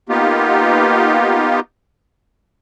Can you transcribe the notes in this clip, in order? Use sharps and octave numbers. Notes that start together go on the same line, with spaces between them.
A#3 B3 D#4 F4 G4